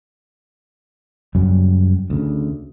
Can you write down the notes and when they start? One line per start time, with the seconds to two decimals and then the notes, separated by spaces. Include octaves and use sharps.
1.35 F#2 C#3 F#3 G3
2.10 D2 C#3